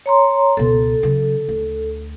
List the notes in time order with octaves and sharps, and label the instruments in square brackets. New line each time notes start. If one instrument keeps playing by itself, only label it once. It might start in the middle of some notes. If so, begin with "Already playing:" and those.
[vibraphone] C#5 A#5 C6
[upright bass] C#2 B2 [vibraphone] A4
[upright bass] C#3 F#3
D2